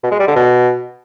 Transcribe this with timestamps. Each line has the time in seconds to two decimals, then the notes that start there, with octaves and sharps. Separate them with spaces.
0.03 B2
0.11 G#3
0.19 G3
0.27 D3
0.36 B2